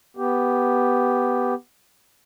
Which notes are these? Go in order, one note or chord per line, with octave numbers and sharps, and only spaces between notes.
B3 G4